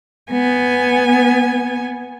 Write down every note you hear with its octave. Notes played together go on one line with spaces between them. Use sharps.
B3 G#5